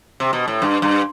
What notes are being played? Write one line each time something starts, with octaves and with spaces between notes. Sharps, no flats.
C3
B2
A2
G2
G2